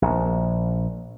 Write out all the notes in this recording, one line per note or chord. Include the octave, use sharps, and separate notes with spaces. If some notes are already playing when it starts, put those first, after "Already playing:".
A#1